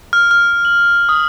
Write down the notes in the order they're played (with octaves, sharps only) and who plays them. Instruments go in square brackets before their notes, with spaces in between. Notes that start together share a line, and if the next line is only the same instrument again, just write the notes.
[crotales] F6
F6
F#7
D#6